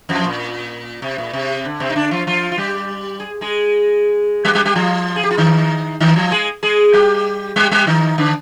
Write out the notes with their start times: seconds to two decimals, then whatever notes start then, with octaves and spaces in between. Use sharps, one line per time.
0.09 F2 F3
0.24 A#2
1.02 C3
1.18 A#2
1.33 C3
1.65 D3
1.80 C3 C4
1.90 D#4
1.96 D3 D4
2.11 F3 F4
2.27 F3 F4
2.52 F4
2.58 G3 G4
3.20 G#4
3.41 G#3 G#4
4.45 G3 G4
4.55 G3 G4
4.65 G3 G4
4.75 F3 F4
5.16 G#4
5.24 G4
5.31 F4
5.37 D#3 D#4
6.00 D#3 D#4
6.16 F3 F4
6.31 G#3 G#4
6.63 G#3 G#4
6.93 G3 G4
7.56 G3 G4
7.71 G3 G4
7.87 D#3 D#4
8.18 D3 D4